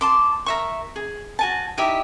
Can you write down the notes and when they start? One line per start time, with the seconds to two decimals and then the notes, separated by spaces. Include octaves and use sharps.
0.01 A5 C6 D6
0.46 A#4 E5 C#6
0.96 G#4
1.39 F#4 G#5 A5
1.78 D#4 E4 G4 E5